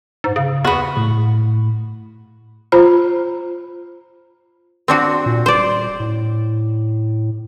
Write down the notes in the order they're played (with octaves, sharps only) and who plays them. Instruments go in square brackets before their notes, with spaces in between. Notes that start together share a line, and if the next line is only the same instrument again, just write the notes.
[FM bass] G#2
C#3
[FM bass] E2 [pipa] B3 F#4
[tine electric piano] A2
[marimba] F4 C5 A#5 B5
[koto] C4 D4 F#4
[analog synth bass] A#2
[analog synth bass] D#1 [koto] C5 D5
[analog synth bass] A2